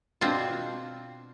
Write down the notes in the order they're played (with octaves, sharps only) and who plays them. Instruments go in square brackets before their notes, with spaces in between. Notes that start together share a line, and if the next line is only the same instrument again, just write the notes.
[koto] B2 C4 D4 F4